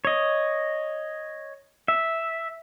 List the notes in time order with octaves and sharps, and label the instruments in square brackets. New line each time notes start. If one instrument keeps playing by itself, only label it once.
[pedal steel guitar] C#5 D#5
E5